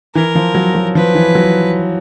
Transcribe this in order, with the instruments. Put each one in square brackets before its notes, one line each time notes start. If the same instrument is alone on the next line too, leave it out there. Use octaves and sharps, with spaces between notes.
[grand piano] E3 [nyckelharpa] A#4
[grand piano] F3
F#3
F#3
[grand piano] F3 [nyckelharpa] B4
[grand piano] E3
F#3